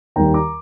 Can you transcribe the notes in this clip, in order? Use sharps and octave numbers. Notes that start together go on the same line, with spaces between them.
D#2 D#3 G3 G5 A#5
A#5 D6